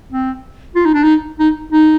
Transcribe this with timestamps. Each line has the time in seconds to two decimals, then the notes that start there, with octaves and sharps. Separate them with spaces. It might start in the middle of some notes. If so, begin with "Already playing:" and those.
0.12 C4
0.75 F4
0.86 D#4
0.94 D4
1.03 D#4
1.39 D#4
1.72 D#4